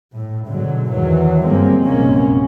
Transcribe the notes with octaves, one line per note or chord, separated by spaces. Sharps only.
A2
G#2 B2 D3 F#3
E2 G#2 D#3 E3 F#3
G1 F3 G#3 A#3 C4
A#1 F#2 C3 G#3 A#3 C#4